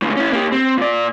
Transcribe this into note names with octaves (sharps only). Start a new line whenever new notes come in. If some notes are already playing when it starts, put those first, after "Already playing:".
C#2 A2
C#4 E4
A#3 G4
C4
A#2 D5